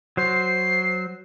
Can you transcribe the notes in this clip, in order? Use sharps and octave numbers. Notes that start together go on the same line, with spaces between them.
F#3 C5 C7